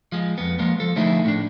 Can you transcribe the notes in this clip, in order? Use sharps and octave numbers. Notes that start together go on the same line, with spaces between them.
F3 G#3
F2 B3
F3 G#3 A#3 B3
F3 A4
D3 F3 A3 D#4 E4 G#4
A2 D4